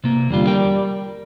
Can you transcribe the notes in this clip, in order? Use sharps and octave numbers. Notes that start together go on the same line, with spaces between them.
C3 A#3
E2 D3 G3 F4
A#4 D5 G5